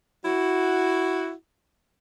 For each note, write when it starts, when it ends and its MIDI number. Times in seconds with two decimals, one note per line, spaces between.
0.25 1.31 64
0.25 1.31 66